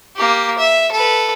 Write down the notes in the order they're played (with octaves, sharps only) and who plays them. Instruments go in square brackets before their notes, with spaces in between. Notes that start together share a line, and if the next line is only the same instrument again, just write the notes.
[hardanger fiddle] A#3 G4
E5
A4 B4